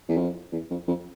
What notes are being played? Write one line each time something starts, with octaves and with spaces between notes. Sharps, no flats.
E2
F2
E2
F2
F2